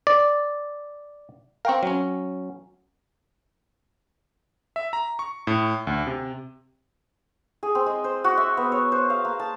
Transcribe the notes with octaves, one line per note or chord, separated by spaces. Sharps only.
D5
C4 A#4 F5 G5 C#6
F#3 C#4
E5
A#5
C#6
A2
D2
C3
G#4
C4
G#3
C5
F#4
E5
B3
C#5
C5
F5
A#3
A5